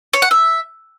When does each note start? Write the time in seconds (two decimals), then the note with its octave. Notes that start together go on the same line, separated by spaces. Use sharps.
0.13 C#5
0.22 F#5
0.31 E5